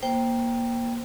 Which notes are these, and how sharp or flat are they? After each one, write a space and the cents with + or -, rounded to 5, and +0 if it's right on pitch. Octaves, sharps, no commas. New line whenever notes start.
A#3 +20 C5 +5 G5 +0